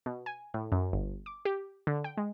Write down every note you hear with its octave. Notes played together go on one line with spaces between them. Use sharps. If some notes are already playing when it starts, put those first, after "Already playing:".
B2
G#5
A2
F#2
G1
D6
G4
D3
G5
G#3